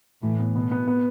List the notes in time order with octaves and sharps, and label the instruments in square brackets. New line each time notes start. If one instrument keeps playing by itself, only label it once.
[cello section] A2 [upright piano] E3
[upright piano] B3
[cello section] B2 [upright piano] B3
[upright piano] B3
B3